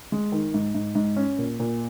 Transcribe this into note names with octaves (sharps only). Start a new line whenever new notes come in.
G#3
D#3
G#2
G#2
G#2
C#4
A#2
A#2